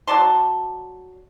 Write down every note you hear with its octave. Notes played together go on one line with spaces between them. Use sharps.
F#3 D5 A5 C6